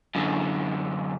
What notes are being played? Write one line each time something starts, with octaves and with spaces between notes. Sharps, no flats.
F#2 D3